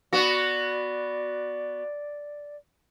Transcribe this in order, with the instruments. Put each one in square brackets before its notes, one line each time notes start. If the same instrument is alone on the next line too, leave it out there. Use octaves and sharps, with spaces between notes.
[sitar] B3 F#4 [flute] D5